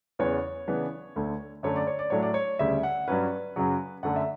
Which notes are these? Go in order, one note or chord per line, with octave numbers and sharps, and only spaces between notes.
E2 C#3 E3 B3 C#5
C#3 E3 B3 D4
D2 D3 A3
F#2 D3 A3 C#5
D5
C#5
D5
A2 F#3 A3 D4 C#5
D5
C#5
D2 C#3 G3 E5
F#5
G2 F#3 C#4 B4
F#2 C#3 F#3
F#2 D3 A3 F#5
E5